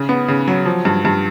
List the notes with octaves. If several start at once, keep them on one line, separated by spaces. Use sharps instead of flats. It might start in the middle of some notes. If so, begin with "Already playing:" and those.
Already playing: C#3
B3
C#3
F#3
F3
G2
G2